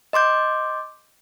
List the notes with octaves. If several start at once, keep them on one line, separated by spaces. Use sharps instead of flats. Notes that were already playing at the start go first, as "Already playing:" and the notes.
D#5 C6 D6 G6